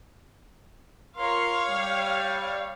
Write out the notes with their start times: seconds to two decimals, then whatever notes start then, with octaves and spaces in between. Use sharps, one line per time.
1.17 F4 A#4 C#5 F5 C6
1.68 G3